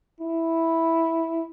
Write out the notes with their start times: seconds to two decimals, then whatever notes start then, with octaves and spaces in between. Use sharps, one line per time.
0.20 E4